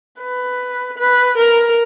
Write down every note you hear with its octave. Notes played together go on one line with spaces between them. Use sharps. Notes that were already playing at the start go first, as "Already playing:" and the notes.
B4
B4
A#4